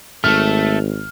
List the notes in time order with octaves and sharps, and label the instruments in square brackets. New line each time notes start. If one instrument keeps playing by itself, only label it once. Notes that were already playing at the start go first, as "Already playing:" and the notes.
[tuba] G#1 [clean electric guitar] A3 A4 [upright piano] F6